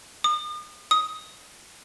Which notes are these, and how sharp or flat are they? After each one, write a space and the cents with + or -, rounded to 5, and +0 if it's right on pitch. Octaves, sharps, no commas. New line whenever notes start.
D#6 -40
D#6 +15